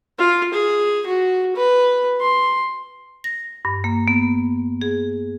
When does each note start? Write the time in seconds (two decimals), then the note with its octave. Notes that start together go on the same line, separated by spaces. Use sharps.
0.18 F4
0.53 G#4
1.06 F#4
1.56 B4
2.21 C6
3.24 A#6
3.65 G2
3.84 A#3
4.08 B3
4.81 G#4